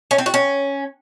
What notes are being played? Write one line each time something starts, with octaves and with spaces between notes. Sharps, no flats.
C#4
C4
F#4
C#4